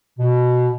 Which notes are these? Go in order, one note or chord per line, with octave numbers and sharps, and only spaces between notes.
B2